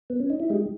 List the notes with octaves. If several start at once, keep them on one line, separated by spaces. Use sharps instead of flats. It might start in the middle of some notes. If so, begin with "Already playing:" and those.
B3
C#4
D#4
E4
G#3 D#4 G4